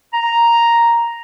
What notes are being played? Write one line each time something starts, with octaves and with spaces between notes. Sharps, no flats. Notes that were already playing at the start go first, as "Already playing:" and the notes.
A#5